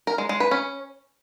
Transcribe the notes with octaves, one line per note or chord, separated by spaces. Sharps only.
A#4
G#3
G#3
B4
C#4